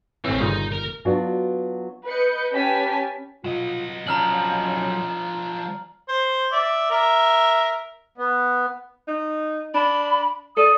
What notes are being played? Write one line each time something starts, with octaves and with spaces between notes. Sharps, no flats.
A1 E3 C4 C#5
G1 A#2 C#3 D#4
A#4
F#3 B3 D4 F4 F#4
B4 D#5 G6 C#7
C#4 G4 B4 G#5 A5 B6
F#3 F4 D#5
F3 C#4 D4 A#5 F6 F#7
C5
D5 E5
A#4 E5
B3
D#4
D4 B5
A4 D5 D#6